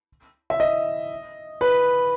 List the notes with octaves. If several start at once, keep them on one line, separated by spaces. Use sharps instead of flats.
E5
D#5
B4